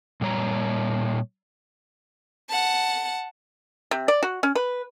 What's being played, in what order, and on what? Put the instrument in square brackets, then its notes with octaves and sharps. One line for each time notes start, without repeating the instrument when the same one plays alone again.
[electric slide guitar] A#2 G3 C#5 A#5
[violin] F#5 A5
[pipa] C3
D5
F#4
C#4
B4